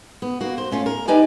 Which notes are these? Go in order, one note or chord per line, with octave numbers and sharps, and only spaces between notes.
B3
A#3 F#4
C5
A3 C#4 F4
A#4
D#4 G4 B4 D5 G#5